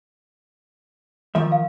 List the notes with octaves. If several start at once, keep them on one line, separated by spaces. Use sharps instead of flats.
D#3 F3 E5
F5